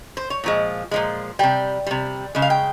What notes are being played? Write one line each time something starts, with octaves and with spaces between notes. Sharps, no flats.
C5
C#5
A#2 F3 G#3
A#2 F3 G#3
C3 G3 G5
C3 G3
C#3 G#3
F5
G5